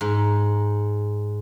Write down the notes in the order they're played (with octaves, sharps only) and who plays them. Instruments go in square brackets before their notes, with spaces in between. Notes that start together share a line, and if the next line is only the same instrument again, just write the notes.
[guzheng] G#2